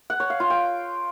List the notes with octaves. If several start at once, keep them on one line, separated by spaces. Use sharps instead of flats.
F#5
C#5
F5
F4
G5